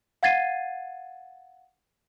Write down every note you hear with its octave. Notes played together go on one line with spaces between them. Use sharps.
F5 F#5 G#6 A6 C7 D#7